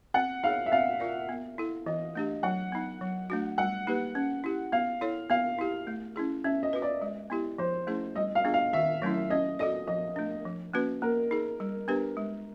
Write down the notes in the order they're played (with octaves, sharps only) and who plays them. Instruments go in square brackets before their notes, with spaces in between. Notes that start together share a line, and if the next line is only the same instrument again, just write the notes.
[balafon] C4 [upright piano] F#5
[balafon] D#4 G#4 C#5 [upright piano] F5
[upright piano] E5
[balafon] C4 [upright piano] F5
[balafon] F4 A#4 D5
B3
E4 A4
[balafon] E3 [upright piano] D#5
[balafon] A3 D4 G4
[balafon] F#3 [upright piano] F#5
[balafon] B3 D#4
F#3
A3 D4 F#4
[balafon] G3 [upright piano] F#5
[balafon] A#3 D#4 G4 B4
C#4
E4 G4
[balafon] B3 [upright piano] F5
[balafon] E4 A4 C#5
[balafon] B3 [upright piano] F5
[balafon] E4 G4
A3
C#4 E4 G#4
[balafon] C#4 [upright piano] E5
[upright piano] D#5
[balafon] F#4 B4
[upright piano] D5
[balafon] G#3
B3 E4 G4
[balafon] F3 [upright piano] C5
[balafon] A3 C#4 E4 G#4
[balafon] G3 [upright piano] D#5
[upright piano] F5
[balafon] B3 D4 F4 G#4
[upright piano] F5
[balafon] D#3 [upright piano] E5
[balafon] F#3 A3 C#4 E4
[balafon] C#4 [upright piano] D#5
[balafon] F#4 A4 D5 [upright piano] D#5
[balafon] F3 [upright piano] D#5
[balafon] A3 D4
F3
A#3 C#4 F#4 B4
[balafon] A#3 [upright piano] A#4
[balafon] D#4 G#4
G3
B3 D4 G4 B4
G#3